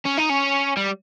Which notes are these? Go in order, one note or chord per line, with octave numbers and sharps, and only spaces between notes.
C#4
D#4
C#4
G3